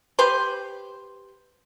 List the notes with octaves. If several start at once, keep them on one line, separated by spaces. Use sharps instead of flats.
G4 B4 C5